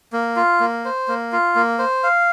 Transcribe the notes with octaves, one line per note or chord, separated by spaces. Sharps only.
A#3
F4
A#3
C5
A#3
F4
A#3
C5
F5